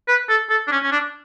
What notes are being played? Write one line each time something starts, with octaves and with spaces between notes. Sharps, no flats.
B4
A4
A4
D4
C#4
C#4
D4